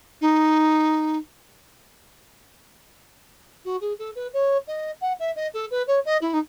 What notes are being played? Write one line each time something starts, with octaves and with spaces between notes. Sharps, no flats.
D#4
F#4
G#4
A4
B4
C#5
D#5
F#5
E5
D#5
A4
B4
C#5
D#5
E4
D#4